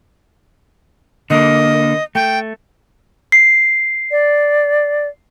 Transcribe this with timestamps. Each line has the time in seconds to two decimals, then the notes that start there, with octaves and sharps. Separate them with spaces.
1.30 D3 A#3 D#5
2.15 A3 G5
3.32 C7
4.11 D5